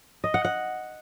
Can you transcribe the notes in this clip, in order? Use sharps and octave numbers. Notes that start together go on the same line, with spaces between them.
D#5
F#5
F#5